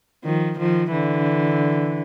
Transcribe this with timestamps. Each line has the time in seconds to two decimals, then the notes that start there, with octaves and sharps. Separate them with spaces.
0.25 D#3 F3
0.59 D#3 F3
0.91 D3 E3